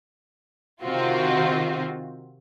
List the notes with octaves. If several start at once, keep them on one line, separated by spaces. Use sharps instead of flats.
C3 D#3 C4 F4 F#4